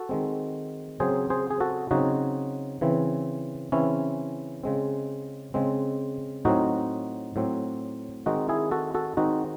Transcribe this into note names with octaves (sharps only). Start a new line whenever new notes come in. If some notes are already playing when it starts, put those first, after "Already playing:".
Already playing: F#4 A4
D#3 G#3 C4
C#3 F#3 C4 G#4 C5
G#4 C5
G#4
F#4 A4
C#3 F#3 C4 D#4 F#4
C#3 E3 C4
C#3 E3 C4 C#4 E4
C#3 G#3 C4
C#3 G#3 C4
A2 F#3 C4 D#4 F#4
A2 F#3 C4
D#3 G#3 C4 D#4 F#4
E4 G#4
F#4 A4
F#4 A4
D#3 G#3 C4 D#4 F#4